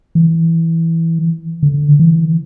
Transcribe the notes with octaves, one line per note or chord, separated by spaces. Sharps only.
E3
D3
E3